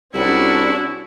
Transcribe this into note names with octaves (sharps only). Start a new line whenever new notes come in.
C2 C#4 D4 E4 F#4 G#4